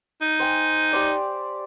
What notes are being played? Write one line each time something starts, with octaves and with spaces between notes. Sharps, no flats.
D#4
C5 G5 G#5
G4 C5 D5